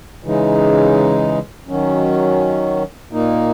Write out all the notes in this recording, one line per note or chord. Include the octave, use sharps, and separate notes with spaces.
C#3 E3 G#3 D#4
D#3 F#3 C#4
A#2 A#3 D#4